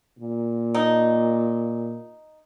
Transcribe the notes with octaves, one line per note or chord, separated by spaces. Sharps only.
A#2
D#4